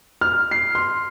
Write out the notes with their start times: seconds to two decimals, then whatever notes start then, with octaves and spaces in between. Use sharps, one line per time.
0.21 F6
0.51 C7
0.75 C6